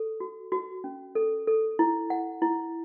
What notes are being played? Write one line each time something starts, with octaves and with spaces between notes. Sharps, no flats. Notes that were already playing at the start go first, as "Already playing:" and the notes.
Already playing: A4
F#4
F#4
C#4
A4
A4
E4
F#5
E4